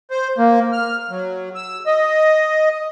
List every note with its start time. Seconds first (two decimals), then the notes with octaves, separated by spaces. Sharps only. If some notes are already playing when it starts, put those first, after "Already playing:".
0.11 C5
0.38 A#3
0.72 F6
1.10 F#3
1.55 E6
1.86 D#5